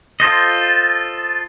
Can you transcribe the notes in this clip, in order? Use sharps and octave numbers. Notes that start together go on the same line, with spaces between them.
F4 A4 C5 D#5